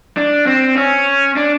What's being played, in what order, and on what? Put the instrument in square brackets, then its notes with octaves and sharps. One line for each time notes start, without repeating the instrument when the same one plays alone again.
[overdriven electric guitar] D4
C4
C#4
D4